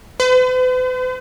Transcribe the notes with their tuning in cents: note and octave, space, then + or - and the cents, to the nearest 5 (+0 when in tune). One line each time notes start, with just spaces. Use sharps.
B4 +45